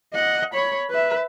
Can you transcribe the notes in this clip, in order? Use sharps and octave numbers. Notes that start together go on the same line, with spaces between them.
D#5 F#5
C#5 B5
B4 E5